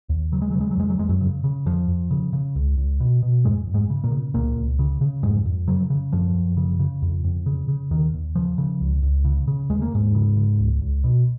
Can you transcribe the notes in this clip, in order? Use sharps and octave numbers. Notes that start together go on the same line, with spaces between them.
D#2
C#3 F#3
G#3
C#3 F#3
G#3
F#3
F2 G#3
F#3
F2 G#3
F#2 F#3
C#3
C#3
F2 F3
F2
C#3
C#3
C#2
C#2
B2
B2
F2 G#2 G#3
F2
G#2 G#3
C#3
A#2 A#3
C#3
C#2 A#2 A#3
C#2
C#3
C#3
F2 G#2 G#3
F2
F#2 C#3 F#3
C#3
F#2 F3
F#2
C#3
C#3
F2
F2
C#3
C#3
D#2 D#3
D#2
C#3 F3
C#3
C#2
C#2
C#3
C#3
D#2 G#3
A#3
D#2 G#2 G#3
C#3
C#3
C#2
C#2
B2